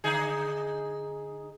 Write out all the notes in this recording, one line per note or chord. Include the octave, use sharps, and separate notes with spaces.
D3 D#4 G#4